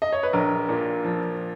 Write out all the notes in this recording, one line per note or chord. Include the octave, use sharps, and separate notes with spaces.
D#5
C#5
B4
A#1 A#4
A#2
F3